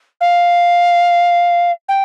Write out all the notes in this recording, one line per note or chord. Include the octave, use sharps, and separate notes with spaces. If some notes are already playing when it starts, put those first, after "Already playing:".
F5
G5